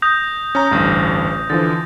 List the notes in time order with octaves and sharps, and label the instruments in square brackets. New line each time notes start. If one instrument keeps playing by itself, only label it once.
[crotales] D#6 G6 A#6
[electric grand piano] C#4 A#5
A1 D2 G2
[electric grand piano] D3 E3 F3 [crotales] A6